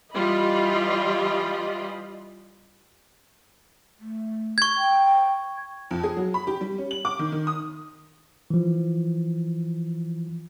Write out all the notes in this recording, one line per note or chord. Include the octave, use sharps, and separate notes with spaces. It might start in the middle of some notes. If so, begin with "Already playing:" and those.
E3 G3 F4 D#5 B5
A3
C#6 G#6
G5
F2
G#4
F#3
B5
G4
G3
C#4
F#7
D6
D#3
D#3
D#6
E3 F3